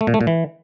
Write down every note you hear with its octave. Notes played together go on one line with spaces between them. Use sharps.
A3
A#2
A3
A#2
E3